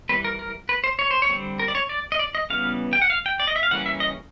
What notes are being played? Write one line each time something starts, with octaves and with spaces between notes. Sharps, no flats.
E3 G3 C4 B4
A#4
A#4
B4
C5
C#5
C5
C#5
D3 G3 C4
A#4
D5
C#5
D5
D#5
D5
D#5
C#3 E3 G3 B3 F5
G5
F#5
F5
G5
D5
D#5
E5
F5
C#3 E3 G3 A#3 C#4 F#5
E5
D#5